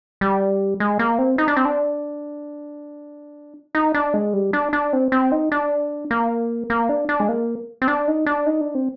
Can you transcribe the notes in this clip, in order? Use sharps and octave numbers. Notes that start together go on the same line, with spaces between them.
G3
G#3
A#3
C4
D#4
D4
C4
D4
D#4
D4
G#3
G3
D4
D4
C4
C4
D#4
D4
A#3
A#3
D4
D4
G#3
A#3
C4
D4
D#4
D4
D#4
D4
C4